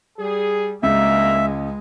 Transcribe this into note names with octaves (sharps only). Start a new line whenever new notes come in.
G3 G#4
C#2 G2 B2 G#3 A#3 E5